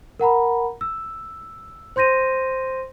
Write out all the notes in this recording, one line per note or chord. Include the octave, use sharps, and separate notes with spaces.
A#4 F#5 A#5 B5
E6
C5 C6 G6 A#6 D#7